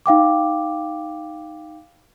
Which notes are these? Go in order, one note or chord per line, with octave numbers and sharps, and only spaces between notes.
D#4 F5 G5 D6